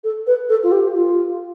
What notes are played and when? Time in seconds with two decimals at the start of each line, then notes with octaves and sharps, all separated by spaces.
0.04 A4
0.27 B4
0.49 A4
0.63 F4
0.72 G4
0.94 F4